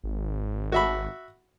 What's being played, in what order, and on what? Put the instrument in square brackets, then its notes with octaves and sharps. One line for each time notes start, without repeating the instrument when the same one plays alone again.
[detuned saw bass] G#1
[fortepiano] F#4 E5 B5